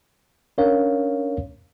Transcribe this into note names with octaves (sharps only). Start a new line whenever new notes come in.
C#4 D4 A#4 C#5 F5